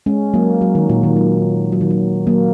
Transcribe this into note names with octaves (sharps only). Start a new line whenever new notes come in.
G#3 C#4
F#3 A#3
F#3
D#3
A#2
D#3
F#3
F#3
D#3
F#3
F#3 A#3